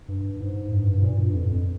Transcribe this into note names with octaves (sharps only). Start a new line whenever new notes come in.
G2
G#2
G2
G2
G#2
A#2
G2
F2
F2